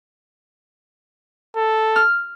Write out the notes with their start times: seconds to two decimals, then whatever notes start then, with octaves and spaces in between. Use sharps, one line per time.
1.56 A4
1.96 F6